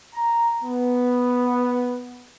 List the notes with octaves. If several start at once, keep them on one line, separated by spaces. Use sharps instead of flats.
A#5
B3